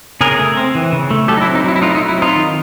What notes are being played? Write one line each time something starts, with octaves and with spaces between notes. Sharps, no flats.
C#3 G#4 A#4
A3
C4
E3
C#3
A3
F#3 G4 A4
D#4
E4
C4
D#4
F#3 E4
E4
A3 D#4 F4
E4
D#4
F#3
E4
C4 D#4 F4
D#3